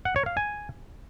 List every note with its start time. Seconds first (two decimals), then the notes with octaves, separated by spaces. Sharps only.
0.05 F#5
0.16 C#5
0.26 F5
0.37 G#5